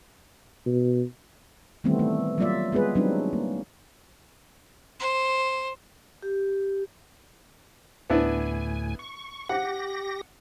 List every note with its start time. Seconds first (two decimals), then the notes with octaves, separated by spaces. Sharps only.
0.66 B2
1.84 D#3 E3 G3 A3 B3 C4
1.99 A3
2.38 F#3 G3 A#3 F4 D5 E5
2.72 G#3 B3 F4 G#4 B4
2.95 F#3 G3 C4 D4 D#4
3.33 A#3
4.99 C5
6.22 G4
8.10 D2 A2 B3 D4 E4 G#5
8.99 C#6
9.49 G4 F#5 A#6